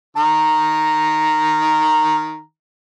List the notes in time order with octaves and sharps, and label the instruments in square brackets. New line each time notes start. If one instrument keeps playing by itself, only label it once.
[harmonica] D#3 A#5